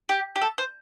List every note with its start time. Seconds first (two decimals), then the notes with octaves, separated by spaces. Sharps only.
0.09 G4
0.36 G4
0.41 A4
0.58 C5